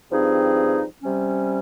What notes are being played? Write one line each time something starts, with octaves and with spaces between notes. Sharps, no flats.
G2 F3 C4 D#4 G#4
C3 G3 C#4